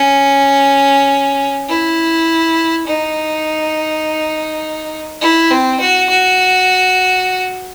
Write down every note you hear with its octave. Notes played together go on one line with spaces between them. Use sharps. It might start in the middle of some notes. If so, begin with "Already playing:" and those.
Already playing: C#4
E4
D#4
E4
C4
F#4
F#4